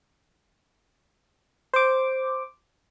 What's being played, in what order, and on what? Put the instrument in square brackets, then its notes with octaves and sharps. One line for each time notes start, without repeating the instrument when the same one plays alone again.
[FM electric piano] C5 D6